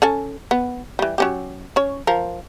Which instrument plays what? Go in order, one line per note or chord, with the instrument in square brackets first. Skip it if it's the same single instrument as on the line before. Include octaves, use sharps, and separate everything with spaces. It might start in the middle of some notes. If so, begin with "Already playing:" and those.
[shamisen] C#4 A4 G#5
B3
E3 G3
F#3 C#4 G4
C#4 C#5
F3 A#4